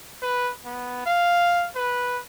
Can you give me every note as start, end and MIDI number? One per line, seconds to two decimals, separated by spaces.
0.22 0.51 71
0.65 1.04 59
1.06 1.67 77
1.75 2.19 71